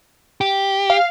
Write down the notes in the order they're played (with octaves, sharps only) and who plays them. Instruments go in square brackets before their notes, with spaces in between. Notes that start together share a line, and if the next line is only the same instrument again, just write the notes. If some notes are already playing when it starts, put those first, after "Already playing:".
[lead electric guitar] G4
[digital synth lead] F5